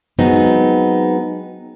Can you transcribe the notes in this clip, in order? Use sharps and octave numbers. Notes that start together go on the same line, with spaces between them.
F#3 G#3 B3 C4 D#4